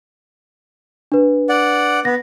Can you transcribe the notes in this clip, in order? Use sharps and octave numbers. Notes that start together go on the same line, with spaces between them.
D4 B4
D5 F#5
B3 A#6